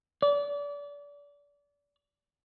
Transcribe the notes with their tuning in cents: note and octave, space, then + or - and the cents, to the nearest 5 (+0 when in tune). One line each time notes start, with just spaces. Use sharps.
D5 -30